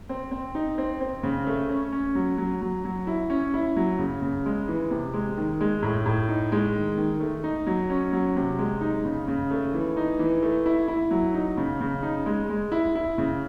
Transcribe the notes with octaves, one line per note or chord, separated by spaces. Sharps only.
C4
C4
D#4
C4
C4
C#3
A3
C#4
C#4
F#3
F#3
F#3
F#3
E4
C#4
E4
F#3
C#3
C#3
G#3
E3
C3
G#3
D#3
G#3
A2
A2
D#4
G#3
D#3
D#3
A3
D#4
F#3
C#4
F#3
C3
G#3
D#4
C#3
C#3
A3
E3
D#4
E3
A3
E4
E4
F#3
D#4
C#3
C#3
D#4
G#3
G#3
E4
E4
C#3